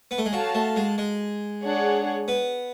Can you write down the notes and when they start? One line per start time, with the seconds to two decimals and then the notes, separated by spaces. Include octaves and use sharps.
0.11 B3
0.18 A3
0.25 G#3
0.32 F#3 F#4 A4 F5 A5
0.55 A3
0.76 G#3
0.98 G#3
1.63 D4 G#4 C#5 F#5
2.28 B3